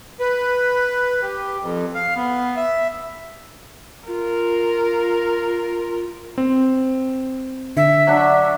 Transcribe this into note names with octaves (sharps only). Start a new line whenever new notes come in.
B4
G4
F2
F5
B3
E5
F4 A#4
C4
D3 E5
F#3 D4